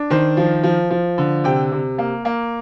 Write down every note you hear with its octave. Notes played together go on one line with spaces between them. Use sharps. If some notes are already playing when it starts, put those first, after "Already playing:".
Already playing: D4
D#3 C5
F3
F3
F3
D3
C3 G5
C3
A#3
A#3